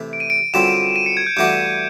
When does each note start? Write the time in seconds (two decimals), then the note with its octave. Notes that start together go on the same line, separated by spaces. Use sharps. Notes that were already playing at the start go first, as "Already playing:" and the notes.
Already playing: C3 E3 A3
0.13 D7
0.20 D#7
0.30 D7
0.54 F#2 D3 G3 C4 F4 E7
0.96 D#7
1.06 C#7
1.17 G#6
1.27 G6
1.37 G2 E3 A3 D4 F#4 G6